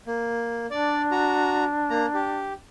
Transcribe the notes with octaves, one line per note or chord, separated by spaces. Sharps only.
A#3
D4 D5
F#4 A#5
A#3 A#5
G4